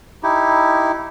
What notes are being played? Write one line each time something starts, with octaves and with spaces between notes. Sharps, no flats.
D#4 E4 G4